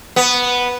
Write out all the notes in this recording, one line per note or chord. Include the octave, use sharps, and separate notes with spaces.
B3